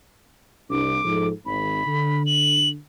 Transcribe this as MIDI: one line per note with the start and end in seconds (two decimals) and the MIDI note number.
0.70 0.97 36
0.70 0.97 62
0.70 1.27 86
1.05 1.30 44
1.05 1.30 53
1.05 1.30 69
1.46 1.82 32
1.46 2.23 83
1.86 2.77 50
2.26 2.68 102